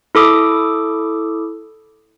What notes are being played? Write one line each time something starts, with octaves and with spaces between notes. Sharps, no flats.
E4 A4 D6 D#6